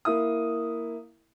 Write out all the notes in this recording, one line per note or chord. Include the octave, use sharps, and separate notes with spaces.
A#3 E4 D#6